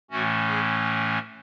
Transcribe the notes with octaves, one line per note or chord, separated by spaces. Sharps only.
A2 E3 A3 C#4 F#4
G#4